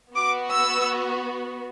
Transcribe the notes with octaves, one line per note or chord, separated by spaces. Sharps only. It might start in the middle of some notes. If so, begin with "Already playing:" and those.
B3 F#4 D6
E6